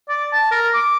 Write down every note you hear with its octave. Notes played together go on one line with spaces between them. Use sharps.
D5
A5
A#4
D6